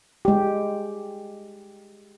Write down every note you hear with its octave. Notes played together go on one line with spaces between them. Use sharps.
G#3 G4